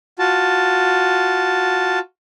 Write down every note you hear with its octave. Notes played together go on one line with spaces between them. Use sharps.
F4 F#4 A5